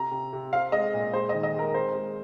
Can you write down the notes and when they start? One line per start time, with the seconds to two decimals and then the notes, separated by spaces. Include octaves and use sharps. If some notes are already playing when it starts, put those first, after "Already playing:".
Already playing: C3 A#5
0.11 C3
0.33 C3
0.53 C4 F5
0.72 G#3 D#5
0.94 A#2
1.13 G#3 C5
1.29 D#5
1.34 D#3
1.43 D#5
1.55 G#3 A#4
1.74 C4 C5
1.95 G#3